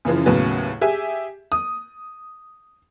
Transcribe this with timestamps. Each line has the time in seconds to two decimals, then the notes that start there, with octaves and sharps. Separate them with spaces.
0.05 F#2 C#3 E3 F3
0.26 D#2 A2 C#3 F#3 B3
0.81 G4 G#4 E5 G#5
1.52 D#6